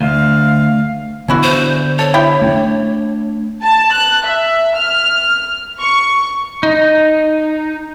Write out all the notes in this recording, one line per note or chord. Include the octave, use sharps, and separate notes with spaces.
D2 F5
D3 B3 C#4 D4 E4 F#4
C5
A4 C#5
E4 G4 G5
A3 C4 D4
A5
F#6
E5
F6
C#6
D#4